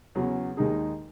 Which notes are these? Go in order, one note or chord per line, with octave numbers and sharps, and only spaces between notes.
E2 C#3 F#3 C#4
D#2 D#3 G#3 D#4 G#4